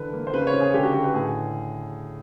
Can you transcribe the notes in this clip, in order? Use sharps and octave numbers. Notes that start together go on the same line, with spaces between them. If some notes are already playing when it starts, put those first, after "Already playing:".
Already playing: D3 E3 B4
A#3
C5
C#3 B4
C5
C#5
C#3
G#4
D3 G4
F#4
D3 G4
B4
A2 G#4